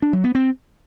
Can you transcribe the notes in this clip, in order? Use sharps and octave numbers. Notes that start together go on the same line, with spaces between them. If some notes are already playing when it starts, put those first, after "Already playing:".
D4
F#3
B3
C4